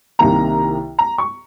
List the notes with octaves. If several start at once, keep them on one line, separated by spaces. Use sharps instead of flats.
C2 C3 D#3 A#3 A#5
A#5
C#6